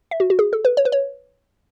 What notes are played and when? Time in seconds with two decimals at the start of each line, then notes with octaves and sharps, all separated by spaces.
0.11 E5
0.20 F#4
0.30 F#4
0.39 G#4
0.53 A4
0.65 B4
0.77 C#5
0.85 B4
0.92 C#5